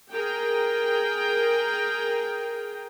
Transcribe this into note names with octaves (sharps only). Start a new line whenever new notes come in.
G#4 A#4 G5